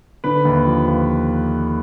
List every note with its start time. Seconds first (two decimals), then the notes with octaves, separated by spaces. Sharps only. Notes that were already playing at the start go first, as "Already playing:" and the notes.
0.24 D3 B4
0.45 D#2
0.66 F3
0.87 D#2